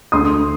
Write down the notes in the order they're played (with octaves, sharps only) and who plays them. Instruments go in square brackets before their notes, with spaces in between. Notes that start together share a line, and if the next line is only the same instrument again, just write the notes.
[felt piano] D2 C6 D#6